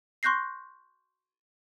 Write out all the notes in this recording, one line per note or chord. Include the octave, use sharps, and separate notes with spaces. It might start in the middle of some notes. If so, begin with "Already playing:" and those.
C6 C#6 F#6 G6 A#6 C7